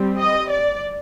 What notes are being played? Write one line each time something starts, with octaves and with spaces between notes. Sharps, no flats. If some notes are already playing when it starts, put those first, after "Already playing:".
Already playing: G3 C4
D#5
D5